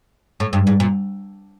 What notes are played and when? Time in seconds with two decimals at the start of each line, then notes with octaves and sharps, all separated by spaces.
0.40 A2
0.53 G2
0.67 G#2
0.80 A#2